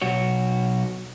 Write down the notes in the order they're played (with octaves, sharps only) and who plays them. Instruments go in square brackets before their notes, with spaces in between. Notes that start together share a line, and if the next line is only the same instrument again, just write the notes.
[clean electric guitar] B1 F#4 C#5